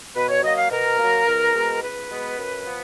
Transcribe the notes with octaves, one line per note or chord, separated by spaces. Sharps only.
B2 B4
C#5
F#3 A#3 D#5
F5
B2 A#4
A#3
F#3
C#2
B2 G#3 B3
C#2 B4
B2 G#3 B3
F#2
F3 B3